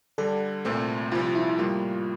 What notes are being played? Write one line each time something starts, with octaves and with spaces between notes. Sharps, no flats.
D3 G3 D4 A4
C2 A#2 A3 C4
C2 C3 F3 F4
E4
A2 G3 A#3 F4